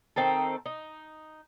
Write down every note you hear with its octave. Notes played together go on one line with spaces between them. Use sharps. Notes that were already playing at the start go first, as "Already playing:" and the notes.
D#3 C4 D#4 A4
D#4